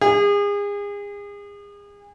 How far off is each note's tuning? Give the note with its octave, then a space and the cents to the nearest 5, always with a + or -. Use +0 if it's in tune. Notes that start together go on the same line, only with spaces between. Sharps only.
G#4 -35